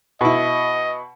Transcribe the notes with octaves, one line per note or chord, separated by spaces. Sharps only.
B2 E4 D#5